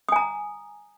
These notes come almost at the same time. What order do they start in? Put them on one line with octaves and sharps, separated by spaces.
D#6 G#5 A#5